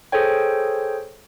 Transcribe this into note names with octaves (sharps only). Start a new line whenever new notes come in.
G#4 A4 C5 C#5 G5